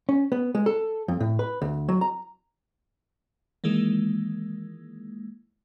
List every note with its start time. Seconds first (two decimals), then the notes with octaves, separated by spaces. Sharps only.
0.09 C#4
0.32 B3
0.55 G#3
0.66 A4
1.08 F2
1.20 A2
1.39 B4
1.62 D2
1.89 F#3
2.01 A#5
3.64 D#3 E3 G#3 A#3